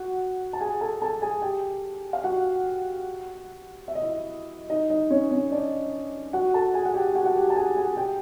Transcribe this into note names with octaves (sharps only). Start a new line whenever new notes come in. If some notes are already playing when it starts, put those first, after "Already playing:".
Already playing: F#4 F#5
A5
G#4 G#5
A4 A5
A4 A5
G#4 G#5
G4 G5
F5
F#4 F#5
E5
D#5
E4 E5
D#4 D#5
D#4 D#5
C#4 C#5
C#4 C#5
D4 D5
F#4 F#5
A4 A5
G#4 G#5
F#5
G4 G5
F#4 F#5
F#5
G4 G5
A5
G#4 G#5
G#4 G#5
G4 G5